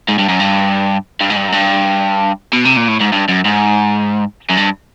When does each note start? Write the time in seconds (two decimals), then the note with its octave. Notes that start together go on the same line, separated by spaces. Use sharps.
0.09 G#2
0.19 G2
0.29 F#2
0.40 G2
1.21 G2
1.30 G#2
1.36 G2
1.48 F#2
1.52 G2
2.53 B2
2.65 C3
2.77 A#2
2.88 A2
3.01 G#2
3.13 G2
3.29 F#2
3.45 G#2
4.49 F#2
4.57 G2